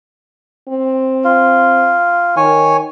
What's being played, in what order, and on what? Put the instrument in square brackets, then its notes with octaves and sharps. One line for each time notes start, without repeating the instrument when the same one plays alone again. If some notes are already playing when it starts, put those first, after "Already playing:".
[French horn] C4
[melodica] F4
[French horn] D#3 [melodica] C#5 G#5